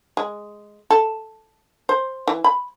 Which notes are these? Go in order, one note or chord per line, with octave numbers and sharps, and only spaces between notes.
G#3
A4
C5
E3
B5